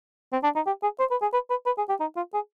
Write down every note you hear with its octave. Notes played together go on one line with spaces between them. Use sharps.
C4
D4
D#4
G4
G#4
C5
B4
G#4
B4
B4
B4
G#4
G4
D#4
F4
G#4